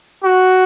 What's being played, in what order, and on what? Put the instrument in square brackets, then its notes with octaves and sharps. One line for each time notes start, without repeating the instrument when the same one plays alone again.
[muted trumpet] F#4